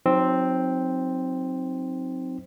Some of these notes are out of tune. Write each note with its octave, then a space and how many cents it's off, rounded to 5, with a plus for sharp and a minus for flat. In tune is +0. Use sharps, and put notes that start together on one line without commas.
F#3 -25 C4 +0 D#4 +0